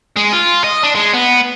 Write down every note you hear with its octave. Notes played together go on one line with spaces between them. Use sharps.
G#3
F4
D#5
D4
G#3
B3